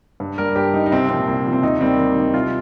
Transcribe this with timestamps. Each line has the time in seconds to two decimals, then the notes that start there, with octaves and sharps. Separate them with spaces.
0.20 G2
0.38 G3 A#4
0.56 G2 G4
0.73 G3 D#4
0.86 D#4
0.91 C2 C4
1.09 A#2 F3 C4
1.28 C2
1.45 A#2 F3
1.53 C4
1.63 D#2 D#4
1.80 D#3 G3 C4
1.99 D#2
2.16 D#3 G3
2.34 C2 F4